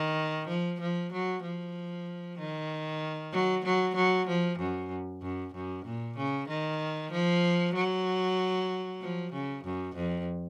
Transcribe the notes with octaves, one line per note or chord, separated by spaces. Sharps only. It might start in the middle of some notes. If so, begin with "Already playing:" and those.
Already playing: D#3
F3
F3
F#3
F3
D#3
F#3
F#3
F#3
F3
F#2
F#2
F#2
A#2
C#3
D#3
F3
F#3
F3
C#3
F#2
F2